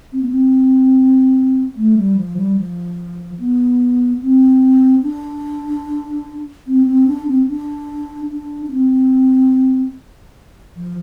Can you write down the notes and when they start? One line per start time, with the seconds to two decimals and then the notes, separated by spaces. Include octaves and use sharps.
0.13 C4
0.21 B3
0.29 C4
1.77 A3
1.97 G3
2.17 F3
2.37 G3
2.57 F3
3.40 B3
4.22 C4
5.03 D4
6.67 C4
6.87 C4
7.07 D4
7.28 C4
7.48 D4
8.30 D4
8.66 D4
8.71 C4
10.76 F3